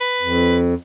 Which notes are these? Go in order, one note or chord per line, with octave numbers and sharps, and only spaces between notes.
B4
F2